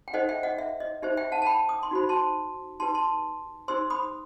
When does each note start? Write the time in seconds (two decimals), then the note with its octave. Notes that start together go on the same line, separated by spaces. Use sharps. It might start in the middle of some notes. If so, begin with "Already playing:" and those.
0.08 G5
0.14 D#4 A4 C5 D#5 F#5
0.29 E5 G5
0.43 D#5 F#5
0.58 E5
0.80 D#5
1.02 D#4 G4 C5 E5
1.17 E5 G5
1.32 F#5 A5
1.42 A5
1.46 G5 B5
1.69 D#6
1.83 C6
1.91 D#4 F#4 C5 B5
2.09 A5 C6
2.80 D#4 G4 B4 A5 C6
2.95 A5 C6
3.68 D#4 G4 C5 C6 E6
3.90 B5 D#6